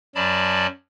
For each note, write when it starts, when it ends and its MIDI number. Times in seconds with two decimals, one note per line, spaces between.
0.15 0.67 42
0.15 0.67 54
0.15 0.67 74
0.15 0.67 81
0.15 0.67 83